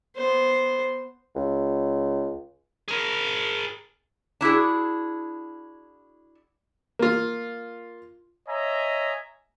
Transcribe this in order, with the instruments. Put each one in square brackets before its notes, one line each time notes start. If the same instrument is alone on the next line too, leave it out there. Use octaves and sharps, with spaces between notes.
[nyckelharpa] B3 C5
[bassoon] C#2
[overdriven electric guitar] G#4 A#4
[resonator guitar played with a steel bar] D4 E4 F#4 G#4
[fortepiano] A#3 F4
[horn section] C#5 D#5 E5 G#5 A#5